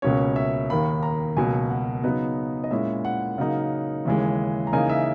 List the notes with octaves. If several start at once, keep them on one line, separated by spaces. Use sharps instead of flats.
C#2 B2 A#3 C#4 C#5
E5
D#2 D#3 A#3 B5
A#5
C#2 B2 F#3 A#3 G#5
F#5
C#3 F#3 B3 D#4
D#5
A#2 G#3 C#4 E4 E5
F#5
C#3 F#3 A#3 D#4
D#2 C#3 E3 G#3
A#5
C#3 E3 A#3 D#4 G#5
E5